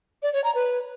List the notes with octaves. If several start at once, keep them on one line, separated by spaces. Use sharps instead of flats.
D5
C#5
A#5
B4